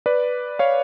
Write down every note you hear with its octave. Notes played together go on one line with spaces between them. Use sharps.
B4 D5
C#5 F5